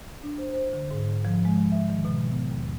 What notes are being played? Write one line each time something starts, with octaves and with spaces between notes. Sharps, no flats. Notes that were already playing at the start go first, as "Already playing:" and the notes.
D4
C5
C5
D3
G#2
F3
G#3
E5
D#3
B2
B3
D#2